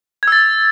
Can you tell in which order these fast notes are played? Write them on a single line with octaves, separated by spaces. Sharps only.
G#6 E6 A6